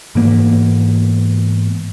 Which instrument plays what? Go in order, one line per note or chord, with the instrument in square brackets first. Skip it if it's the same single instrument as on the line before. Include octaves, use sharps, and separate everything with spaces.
[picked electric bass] G#2 E3 A#3 B3